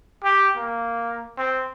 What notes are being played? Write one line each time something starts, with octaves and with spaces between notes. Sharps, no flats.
G4
A#3
C4